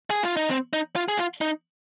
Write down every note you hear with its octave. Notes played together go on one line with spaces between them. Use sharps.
G#4
F4
D#4
C4
D#4
F4
G#4
F4
D#4